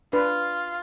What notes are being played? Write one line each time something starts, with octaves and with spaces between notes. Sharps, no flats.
D4 F4 B4